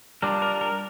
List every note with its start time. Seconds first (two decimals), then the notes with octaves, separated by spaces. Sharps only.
0.22 G3 D4 F4 A#4
0.42 A#4
0.61 A#4